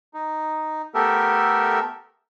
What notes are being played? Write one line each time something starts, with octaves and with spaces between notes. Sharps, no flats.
D#4
A3 B3 G4 A4 A#4 E5